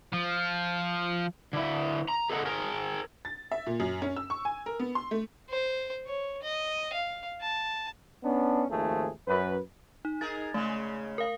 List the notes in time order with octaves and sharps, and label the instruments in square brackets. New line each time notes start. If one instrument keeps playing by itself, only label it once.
[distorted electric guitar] F3
[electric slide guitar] D3 E4
A#5
G#4 A4 D#5 F#5
G#4 A#4
[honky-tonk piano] A6
E5
A#2
F#2
C#4
E6
C#6
G#5
A#4
B3
C6
A3
[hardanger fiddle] C5
C#5
D#5
F5
A5
[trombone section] B3 C#4 D4
G#1 D#2 D#3 F3 A3 G#4
F#2 B4
[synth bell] D#4
[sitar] D#4 G#4 A#4 [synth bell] A6
[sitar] C#3 G#3 [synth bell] A3
[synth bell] A#4 F5